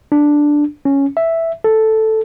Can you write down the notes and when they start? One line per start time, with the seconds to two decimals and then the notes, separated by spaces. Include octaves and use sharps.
0.12 D4
0.85 C#4
1.17 E5
1.64 A4